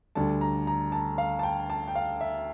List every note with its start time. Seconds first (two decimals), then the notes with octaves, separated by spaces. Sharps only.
0.15 D2 D3 G3 A5
0.41 A#5
0.67 A#5
0.92 A5
1.18 F5
1.39 A5
1.43 G5
1.70 A5
1.88 G5
1.95 F5
2.21 E5